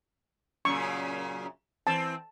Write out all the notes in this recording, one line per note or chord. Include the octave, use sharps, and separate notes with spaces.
F#2 A#2 C#3 C#6
E3 C4 A5